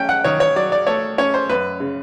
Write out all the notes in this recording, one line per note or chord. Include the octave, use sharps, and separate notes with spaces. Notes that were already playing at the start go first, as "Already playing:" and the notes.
Already playing: A3 C#4 G5
F#5
D#3 C#5
C#5
F#3 D5
D5
A3 C#5
C#4 C#5
C5
F#2 B4
C#3